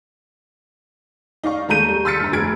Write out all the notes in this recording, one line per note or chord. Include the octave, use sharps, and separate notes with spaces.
D#4 D5 F5 C#6
D#2 G#3 A4 A#5 G6 D#7
G3
C6 E6 F6 A6 B6 C#7
G1 A#5
F1 F#4 G#4 G#6 D7